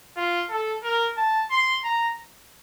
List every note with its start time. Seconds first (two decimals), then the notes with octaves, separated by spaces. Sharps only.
0.17 F4
0.50 A4
0.83 A#4
1.17 A5
1.51 C6
1.84 A#5